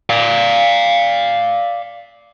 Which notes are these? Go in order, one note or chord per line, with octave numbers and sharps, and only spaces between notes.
D5 F5